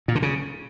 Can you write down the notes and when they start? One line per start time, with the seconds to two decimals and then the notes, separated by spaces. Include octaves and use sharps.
0.08 A#2
0.15 D3
0.22 C#3